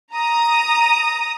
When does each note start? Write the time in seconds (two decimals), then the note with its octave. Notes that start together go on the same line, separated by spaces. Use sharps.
0.15 A#5 D#6